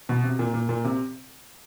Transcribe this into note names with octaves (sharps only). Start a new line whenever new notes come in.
B2
C3
A#2
A#2
A#2
C3